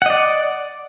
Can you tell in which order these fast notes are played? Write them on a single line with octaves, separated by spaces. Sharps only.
F#5 D#5 D5